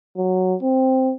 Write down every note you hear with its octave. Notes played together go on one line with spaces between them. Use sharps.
F#3
C4